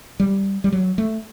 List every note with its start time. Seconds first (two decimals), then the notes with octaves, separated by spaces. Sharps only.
0.20 G3
0.64 G3
0.72 F#3
0.98 A3